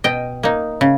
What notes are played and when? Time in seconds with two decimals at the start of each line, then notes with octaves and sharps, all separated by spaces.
0.04 B2 D#5 G5
0.43 A#3 D#4
0.81 C#3